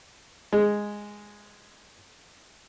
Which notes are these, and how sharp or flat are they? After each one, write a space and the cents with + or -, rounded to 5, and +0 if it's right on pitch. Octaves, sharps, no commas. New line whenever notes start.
G#3 -5